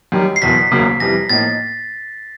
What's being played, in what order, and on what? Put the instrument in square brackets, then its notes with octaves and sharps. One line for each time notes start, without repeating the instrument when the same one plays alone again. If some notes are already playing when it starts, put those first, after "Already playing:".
[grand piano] F#2 D#3 G3
[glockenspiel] C7
[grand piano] F#1 E2 B2 [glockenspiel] B6
[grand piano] E1 D2 C#3 F#3 A#3
[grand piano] F2 C3 E3 G3 [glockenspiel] A#6
[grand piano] A2 F3 A#3 D#4 [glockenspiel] A6